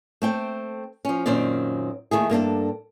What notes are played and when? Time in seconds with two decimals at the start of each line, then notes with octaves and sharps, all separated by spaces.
0.22 A3 C4 G5
1.05 F3 C#4
1.26 F#2 A#2 D#3 C4 C#4 D5
2.11 D#2 D#3 A3 G#4
2.30 G2 A#3 D4 A4